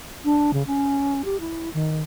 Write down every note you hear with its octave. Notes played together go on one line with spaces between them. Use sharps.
D4
C#3
C#4
G4
E4
D#3